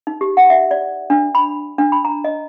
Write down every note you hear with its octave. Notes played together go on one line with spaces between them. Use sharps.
D#4
G4
F#5
E5
D5
D4
B5
D4
B5
A#5
D#5